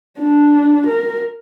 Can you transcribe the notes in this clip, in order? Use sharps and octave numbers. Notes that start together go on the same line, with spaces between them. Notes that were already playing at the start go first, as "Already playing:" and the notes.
D4
A#4